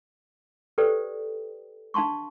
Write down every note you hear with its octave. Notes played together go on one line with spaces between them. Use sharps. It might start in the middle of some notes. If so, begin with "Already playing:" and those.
G4 A4 B4 C5 D5 G5
D4 F5 A5 C6 C#6